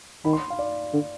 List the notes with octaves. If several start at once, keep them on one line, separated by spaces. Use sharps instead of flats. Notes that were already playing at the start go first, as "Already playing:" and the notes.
D#3 B5
C6
F5
D5
D3